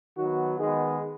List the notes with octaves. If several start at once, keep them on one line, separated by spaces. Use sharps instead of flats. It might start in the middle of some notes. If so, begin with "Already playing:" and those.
D#3 F#3 B3 F#4
D#3 G#3 B3 G#4